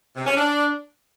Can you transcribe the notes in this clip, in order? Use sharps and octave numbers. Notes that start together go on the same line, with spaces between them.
C3
C#4
D4